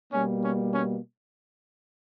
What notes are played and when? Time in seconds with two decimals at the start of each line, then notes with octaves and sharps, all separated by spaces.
0.13 B2 G3 A#3 C#4
0.43 C#4
0.73 C#4